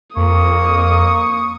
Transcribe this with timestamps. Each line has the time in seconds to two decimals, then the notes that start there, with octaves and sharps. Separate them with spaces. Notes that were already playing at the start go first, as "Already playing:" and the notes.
0.16 F2 A#3 C#6 D#6